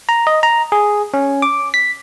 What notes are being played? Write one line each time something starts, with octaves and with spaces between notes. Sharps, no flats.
A#5
D#5
A#5
G#4
C#4
D6
B6